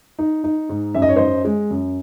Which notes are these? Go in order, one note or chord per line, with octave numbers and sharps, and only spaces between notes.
D#4
D#4
G#2
F#2 E5
D#5
C#5
F#2 C5 D#5
G#3
F#2